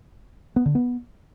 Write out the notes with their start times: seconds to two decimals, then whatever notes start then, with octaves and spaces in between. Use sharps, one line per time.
0.56 B3
0.66 D3
0.75 B3